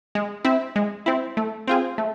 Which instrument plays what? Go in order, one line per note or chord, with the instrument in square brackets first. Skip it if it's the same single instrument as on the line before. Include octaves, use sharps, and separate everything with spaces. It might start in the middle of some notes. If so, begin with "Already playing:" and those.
[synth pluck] G#3
C4 E4
G#3
C4 E4
A3
C4 F4 G#4
A3